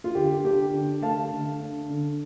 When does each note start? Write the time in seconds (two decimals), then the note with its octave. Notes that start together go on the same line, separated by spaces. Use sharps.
0.04 F4
0.15 D3 G4
0.45 D4 G4
0.74 D3
1.02 A3 F5 A5
1.31 D3
1.61 D4
1.90 D3